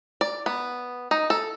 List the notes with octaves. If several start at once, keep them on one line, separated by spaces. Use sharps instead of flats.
D5
B3
D#4
A4